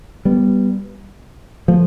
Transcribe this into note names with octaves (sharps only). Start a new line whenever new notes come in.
G3 B3
F3 A3